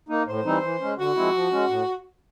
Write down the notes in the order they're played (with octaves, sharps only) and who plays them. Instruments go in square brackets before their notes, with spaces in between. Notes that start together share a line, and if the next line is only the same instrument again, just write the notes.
[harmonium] A#3 D#4
[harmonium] A2 [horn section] C5
[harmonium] E3 G3 C4 D#4
E3
G#3 C#4
[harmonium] D3 [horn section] F#4
[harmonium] F3 G#3 C4 E4
F3
G#3 C#4
A2